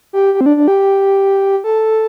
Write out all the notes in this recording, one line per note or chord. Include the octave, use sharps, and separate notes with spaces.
G4
G4
C4
D4
D4
G4
A4